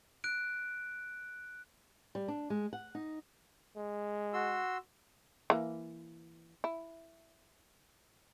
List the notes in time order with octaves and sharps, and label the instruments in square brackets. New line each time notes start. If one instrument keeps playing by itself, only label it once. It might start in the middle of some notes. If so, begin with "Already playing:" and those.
[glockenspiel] F#6 D7
[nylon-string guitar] G3
D4
G#3
F#5
D#4
[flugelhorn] G#3
[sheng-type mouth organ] F#4 C6 E6
[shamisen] E3 A#3
E4